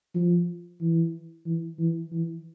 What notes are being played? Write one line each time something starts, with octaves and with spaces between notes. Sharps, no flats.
F3
E3
E3
E3
E3